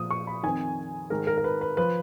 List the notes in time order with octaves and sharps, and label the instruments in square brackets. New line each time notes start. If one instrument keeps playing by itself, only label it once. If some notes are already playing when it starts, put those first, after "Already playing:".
Already playing: [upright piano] A#2 F3 D#6
C#6
B5
F2 D#3 G#5
G#2 D#3 A#4
A#4
A#4
B4
B4
F3 B4